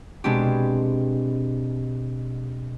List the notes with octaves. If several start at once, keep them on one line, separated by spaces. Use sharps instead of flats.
B2 G#3 B3 C4 D4 G4